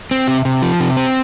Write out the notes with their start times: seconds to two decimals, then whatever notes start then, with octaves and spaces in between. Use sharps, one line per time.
0.11 C4
0.28 C3
0.45 C3
0.62 F3
0.80 C3
0.97 C4